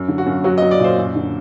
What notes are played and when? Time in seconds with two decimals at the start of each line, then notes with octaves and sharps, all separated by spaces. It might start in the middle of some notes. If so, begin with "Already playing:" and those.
Already playing: F#2
0.08 D3
0.18 F#4
0.26 F#2
0.44 F#3 F#4
0.58 D#5
0.62 F#3
0.71 D5
0.80 A#2 C5
0.98 F#2
1.16 D3